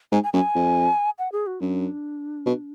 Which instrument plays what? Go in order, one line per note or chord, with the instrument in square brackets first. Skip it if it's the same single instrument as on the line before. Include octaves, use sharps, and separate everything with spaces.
[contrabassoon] G#2 [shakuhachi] G#5
[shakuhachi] G#5
[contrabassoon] F#2 [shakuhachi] G#5
[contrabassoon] F2
[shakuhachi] F#5
G#4
F#4
[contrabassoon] F#2 [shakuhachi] D4
[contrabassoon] B2